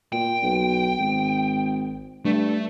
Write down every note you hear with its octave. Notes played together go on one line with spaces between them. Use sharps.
A#2 G5
B1
G#1
G2 A3